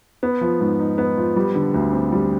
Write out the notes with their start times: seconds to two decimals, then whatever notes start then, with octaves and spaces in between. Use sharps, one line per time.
0.23 B3
0.41 F3
0.61 G#2
0.79 D#4
0.98 B3
1.17 F3
1.36 G3
1.55 D3
1.74 D2
1.92 C4
2.12 G3